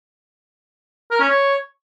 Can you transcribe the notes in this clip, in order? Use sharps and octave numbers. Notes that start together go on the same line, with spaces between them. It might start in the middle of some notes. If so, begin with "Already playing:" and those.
A#4
C#4
C#5